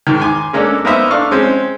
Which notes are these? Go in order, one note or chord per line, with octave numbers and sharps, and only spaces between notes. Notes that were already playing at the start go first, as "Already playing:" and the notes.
G#2 D#3
G#5 C6 D6
G#3 A#3 C#4 D4 A4
A#3 B3 D#4 A#4 C5 E5
D4 A4 F5 C#6
G#3 C4 C#4